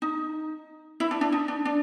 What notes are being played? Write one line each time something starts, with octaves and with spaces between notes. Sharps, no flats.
D#4
E4
D4
D4
D#4
D4
D4